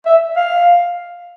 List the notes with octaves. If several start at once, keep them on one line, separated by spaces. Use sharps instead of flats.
E5
F5